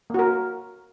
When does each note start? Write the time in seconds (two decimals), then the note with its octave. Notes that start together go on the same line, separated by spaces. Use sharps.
0.10 A#3
0.14 F#4
0.19 A#4